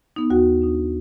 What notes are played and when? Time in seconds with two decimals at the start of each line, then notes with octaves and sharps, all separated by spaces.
0.16 B3 D#4
0.30 D#2 F#4 F#5
0.62 D4 D#4